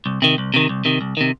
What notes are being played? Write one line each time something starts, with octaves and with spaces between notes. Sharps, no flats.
C2
C3 D#3
C2
C3 D#3
C2
C3 D#3
C2
C3 D#3